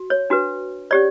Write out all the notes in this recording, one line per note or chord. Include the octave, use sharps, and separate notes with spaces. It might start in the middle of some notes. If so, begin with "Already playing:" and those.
Already playing: F#4
C#5
D4 F#4 B4
C#4 G4 C#5 D5